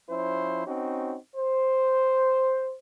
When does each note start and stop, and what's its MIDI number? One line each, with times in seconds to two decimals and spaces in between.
0.10 0.65 53
0.10 0.65 61
0.10 0.65 64
0.10 0.65 72
0.67 1.17 60
0.67 1.17 61
0.67 1.17 63
0.67 1.17 66
1.37 2.76 72